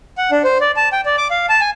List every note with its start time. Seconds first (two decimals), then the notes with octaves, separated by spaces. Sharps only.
0.18 F#5
0.31 D4
0.44 C5
0.61 D5
0.76 A5
0.92 G5
1.06 D5
1.18 D6
1.31 F5
1.49 A5
1.61 G#5